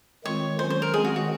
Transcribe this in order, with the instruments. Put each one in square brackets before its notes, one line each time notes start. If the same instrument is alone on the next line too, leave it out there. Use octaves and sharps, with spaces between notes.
[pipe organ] D#3 G#3 C4 F4 [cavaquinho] C#5
[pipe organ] D#3 F#3 C#4 [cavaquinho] C5
[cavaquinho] C5
A#4
[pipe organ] D#3 G#3 C4 [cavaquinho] G#4
[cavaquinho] F#4
F#4